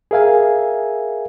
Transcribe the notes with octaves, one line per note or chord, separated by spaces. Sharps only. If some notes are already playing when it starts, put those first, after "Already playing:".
G#4 A#4 E5 F5 G#5